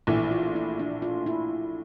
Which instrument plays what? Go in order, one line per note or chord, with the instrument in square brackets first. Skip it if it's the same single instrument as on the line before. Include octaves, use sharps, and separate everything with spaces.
[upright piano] A#1 A2 E3 [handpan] E4
[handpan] F4
E4
D4
F4
E4